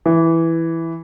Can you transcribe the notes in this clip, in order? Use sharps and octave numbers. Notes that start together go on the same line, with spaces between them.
E3